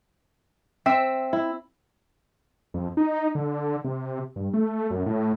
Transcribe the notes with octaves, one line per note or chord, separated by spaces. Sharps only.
C4 E5
E4
F2
D#4
D3
C3
G2
A3
F#2
A2